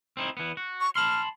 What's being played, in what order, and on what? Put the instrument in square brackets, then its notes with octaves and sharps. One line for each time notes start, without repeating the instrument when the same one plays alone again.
[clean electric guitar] C4 D#4 E4
E3 B3
F#4
[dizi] C#6
[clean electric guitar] A5 B5 C6 [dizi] F6